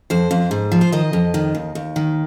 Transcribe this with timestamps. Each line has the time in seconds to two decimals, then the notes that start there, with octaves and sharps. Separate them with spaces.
0.10 F2 C5
0.31 F2
0.51 G#2
0.72 F3
0.81 C5
0.92 D#3 D#5
1.13 F2
1.34 D#3
1.55 D#2
1.75 D#2
1.96 D#3